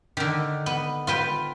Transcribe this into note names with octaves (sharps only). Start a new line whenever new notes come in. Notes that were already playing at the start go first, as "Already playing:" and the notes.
D3 D#3
B3
F4 B4 G5